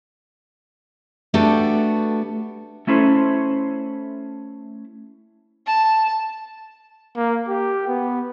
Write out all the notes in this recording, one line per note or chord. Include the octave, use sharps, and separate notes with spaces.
A3 B3 D4 F#4 G4 A4
A3 C#4 E4 A4 C5
A5
A#3
G4
B3